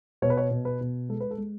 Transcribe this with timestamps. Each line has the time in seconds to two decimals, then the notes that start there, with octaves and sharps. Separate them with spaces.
0.22 B2 C#5
0.30 B4
0.37 C#5
0.51 B2
0.65 B4
0.81 B2
1.09 G#3 A4
1.20 B4
1.31 A4
1.38 G#3